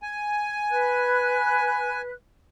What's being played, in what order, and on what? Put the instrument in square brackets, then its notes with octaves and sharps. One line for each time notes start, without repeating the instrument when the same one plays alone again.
[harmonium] G#5
[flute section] B4 F#6